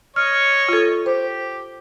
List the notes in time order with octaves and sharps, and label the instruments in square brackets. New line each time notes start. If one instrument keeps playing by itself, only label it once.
[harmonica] C#5 D#5 C#6 [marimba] F6
[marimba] F4 A4
[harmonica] G4 [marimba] C5